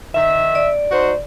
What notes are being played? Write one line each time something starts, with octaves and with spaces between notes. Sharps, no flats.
D#3 E5
D5
D#4 F#4 C5